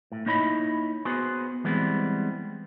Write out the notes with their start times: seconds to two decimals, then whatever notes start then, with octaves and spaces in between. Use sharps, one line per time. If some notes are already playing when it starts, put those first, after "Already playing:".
0.12 A2
0.26 A#3 D#4 E4 C#5 D#5 B5
1.05 B3 F#4 G#4 B4 C5
1.64 E3 G3 G#3 B3 C4